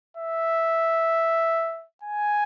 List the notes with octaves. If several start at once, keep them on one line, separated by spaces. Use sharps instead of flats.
E5
G#5